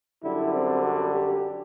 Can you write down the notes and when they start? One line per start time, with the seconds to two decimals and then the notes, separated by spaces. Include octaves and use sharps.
0.23 F#2 D3 G3 E4
0.54 C4
0.85 F#4
1.15 G4